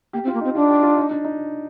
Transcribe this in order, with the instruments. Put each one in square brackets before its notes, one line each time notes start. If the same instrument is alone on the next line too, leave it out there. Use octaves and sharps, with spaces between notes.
[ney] A#3 [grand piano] G4
[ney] C4
[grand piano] F4
[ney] A#3
[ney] C4 [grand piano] D#4
[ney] D4 [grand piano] F4
[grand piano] G4
F4
D#4
D4
D#4